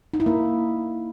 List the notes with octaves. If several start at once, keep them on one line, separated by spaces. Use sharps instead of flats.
D#4
E4
A#3